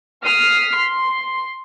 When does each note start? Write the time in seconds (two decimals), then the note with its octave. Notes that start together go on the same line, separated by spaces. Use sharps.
0.24 D#6 F6 B6 C7
0.76 C6